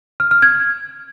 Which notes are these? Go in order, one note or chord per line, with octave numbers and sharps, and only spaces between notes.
F6
F6
G#6